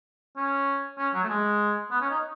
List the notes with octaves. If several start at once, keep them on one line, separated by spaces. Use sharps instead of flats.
C#4
C#4
F#3
A3
G#3
B3
C#4
D#4